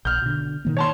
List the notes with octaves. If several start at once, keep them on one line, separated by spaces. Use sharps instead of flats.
A#1 F6 G6
B2 D3
B2 D#3 A#3
C#5 A5 C6